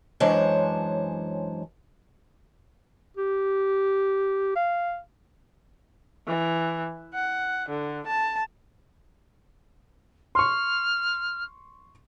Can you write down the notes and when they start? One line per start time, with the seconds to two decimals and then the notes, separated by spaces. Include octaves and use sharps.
0.20 F#2 E3 G#3 D4 C5 C#5
3.17 G4
4.56 F5
6.27 E3
7.14 F#5
7.69 D3
8.07 A5
10.35 C6 C#6 F6